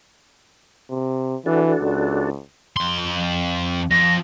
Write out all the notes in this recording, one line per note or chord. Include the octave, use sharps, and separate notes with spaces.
C3
E3 D4 F#4 A4
C#2
F2 C6
F2 A#6